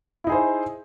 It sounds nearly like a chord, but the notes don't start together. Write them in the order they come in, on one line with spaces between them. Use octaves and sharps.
E4 D#4 G#4 C5